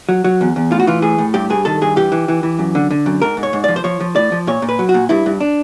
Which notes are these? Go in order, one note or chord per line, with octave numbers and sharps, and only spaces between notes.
F#3
F#3
E2
E2
A2 F4
F#4
E3 F4
A2 G#4
A2
G2 G4
G2 G#4
D#3 A4
G2 G#4
E3 G4
E3
E3
E3
F#2
D3
D3
F#2
G#2 A#4
G#2
C#5
G#2
F3 D5
C5
F3 C#5
F3
A2 D5
F3
A#2 C#5
A#2
B4
F#3
F#4
A#2
G2 E4
G2
D4